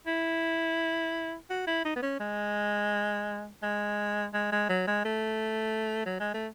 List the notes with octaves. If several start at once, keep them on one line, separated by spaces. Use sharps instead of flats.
E4
F#4
E4
D#4
B3
C#4
G#3
G#3
G#3
G#3
F#3
G#3
A3
F#3
G#3
A3